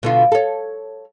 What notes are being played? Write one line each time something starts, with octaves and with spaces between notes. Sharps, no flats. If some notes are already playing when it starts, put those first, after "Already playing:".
B2 D3 F4
A4 C#5